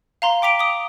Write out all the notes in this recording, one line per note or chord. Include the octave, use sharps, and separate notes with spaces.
F5 A#5 C6
G5 D6 B6 D7 F7
D6 D#6